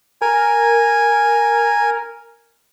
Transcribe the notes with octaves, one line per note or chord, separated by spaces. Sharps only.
A#4 G#5